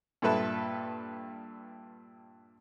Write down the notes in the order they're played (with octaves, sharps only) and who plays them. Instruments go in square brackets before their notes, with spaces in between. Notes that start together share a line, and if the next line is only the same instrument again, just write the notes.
[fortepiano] G2 A#2 A4 B4 E5 A5